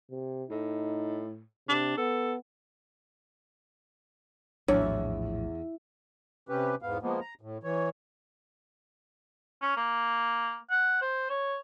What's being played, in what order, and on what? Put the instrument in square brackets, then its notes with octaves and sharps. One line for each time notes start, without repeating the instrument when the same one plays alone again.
[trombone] C3
[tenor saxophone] A2 [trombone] D#4
[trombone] C3 [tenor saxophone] D4
[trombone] B3 [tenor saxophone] A4
[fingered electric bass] A#1 A2 F3 [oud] E2 [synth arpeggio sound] F#3 D4 [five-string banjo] C#5
[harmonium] C3 C#4 G4 B4
E2 G#2 B3 F5
F3 G#3 A#3 B3
A#5
A2
E3 C#5
[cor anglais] C#4
A#3
F#5
C5
C#5